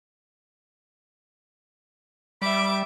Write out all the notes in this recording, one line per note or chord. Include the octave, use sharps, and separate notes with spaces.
G3 E5 B5 D6